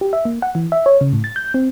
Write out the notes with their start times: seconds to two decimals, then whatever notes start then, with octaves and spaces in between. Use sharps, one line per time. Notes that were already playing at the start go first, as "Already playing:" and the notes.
0.01 G4
0.13 E5
0.25 A#3
0.42 F#5
0.55 E3
0.72 E5
0.86 C#5
1.01 C#3
1.13 A2
1.24 A6
1.36 G6
1.54 C4